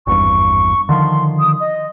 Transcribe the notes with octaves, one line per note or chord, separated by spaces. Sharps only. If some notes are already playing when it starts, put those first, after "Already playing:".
G#1 E2 G2 C#6
D3 D#3 F3 C6
D#6
D#5